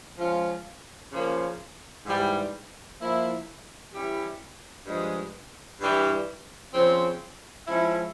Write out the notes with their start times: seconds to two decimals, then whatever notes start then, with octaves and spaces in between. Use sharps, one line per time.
0.18 F3 G#3 C#4 F4
1.12 C#3 F3 A#3
2.05 G#2 E3 G3
2.99 F3 A#3 E4
3.92 E3 G3 C#4 E4 G4
4.86 G2 F3 G#3
5.79 G2 E3 G3
6.74 C#3 F3 C4
7.67 F3 G#3 C#4 E4